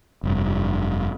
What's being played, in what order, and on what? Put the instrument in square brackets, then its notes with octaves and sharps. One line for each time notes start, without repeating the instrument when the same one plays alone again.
[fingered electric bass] F1 G2